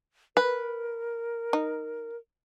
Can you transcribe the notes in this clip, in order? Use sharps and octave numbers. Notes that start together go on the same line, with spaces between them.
A#4 B4
D#4